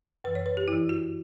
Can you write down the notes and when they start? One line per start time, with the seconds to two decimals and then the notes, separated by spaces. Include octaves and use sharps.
0.24 F#2 E3 B4
0.35 C#5
0.46 B4
0.57 G4
0.68 G2 E3 E4
0.89 F#4